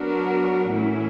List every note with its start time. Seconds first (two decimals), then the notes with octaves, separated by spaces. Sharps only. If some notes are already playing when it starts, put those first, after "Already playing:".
Already playing: F#3 B3 D4 F#4 A#4
0.69 A2 E3 A3 C#4 E4